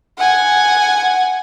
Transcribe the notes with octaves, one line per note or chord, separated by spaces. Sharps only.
F#5 G#5